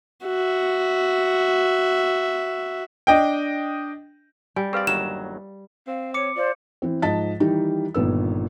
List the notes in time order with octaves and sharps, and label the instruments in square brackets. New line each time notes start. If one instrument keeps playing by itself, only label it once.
[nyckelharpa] F#4 E5
[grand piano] D4 D#5 G5
[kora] G3 [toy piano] G#5
[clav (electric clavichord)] C4 D5 [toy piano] G#4 B4 F5
[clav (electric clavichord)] G1 D#2 F#3 [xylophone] E7
[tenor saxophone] C4 [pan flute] F5
[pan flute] C#5 [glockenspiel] D6 C#7
[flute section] F4 C5 [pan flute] D5
[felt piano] E3 C4
G#2 F3 D#5 A5 A6 B6
D#3 E3 G3 D#4
G1 A#2 D#3 B3 E6